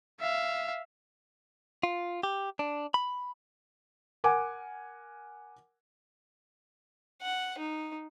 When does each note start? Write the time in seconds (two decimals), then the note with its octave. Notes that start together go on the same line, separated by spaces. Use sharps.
0.20 E5 F5
1.83 F4
2.23 G4
2.59 D4
2.94 B5
4.24 A#4 F#5 G#5 D6
7.22 F#5
7.58 D#4